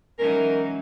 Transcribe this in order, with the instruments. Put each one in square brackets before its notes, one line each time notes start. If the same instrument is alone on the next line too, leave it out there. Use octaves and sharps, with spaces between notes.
[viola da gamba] E3 F#3 D#4 [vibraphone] G#3 C#4 E5 [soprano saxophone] A#4